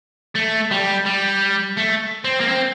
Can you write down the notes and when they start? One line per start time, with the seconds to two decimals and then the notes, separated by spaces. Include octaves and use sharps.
0.35 A3
0.71 G3
1.06 G3
1.77 A3
2.24 C4
2.40 A#3
2.48 C4